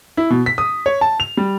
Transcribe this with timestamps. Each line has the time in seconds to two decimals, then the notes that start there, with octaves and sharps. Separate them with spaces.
0.17 E4
0.30 B2
0.46 B6
0.58 D#6
0.86 C#5
1.01 A5
1.20 F7
1.37 G3